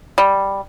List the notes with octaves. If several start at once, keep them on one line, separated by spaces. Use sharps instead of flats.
G3